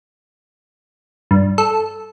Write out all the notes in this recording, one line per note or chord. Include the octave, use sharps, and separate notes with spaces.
G2
A4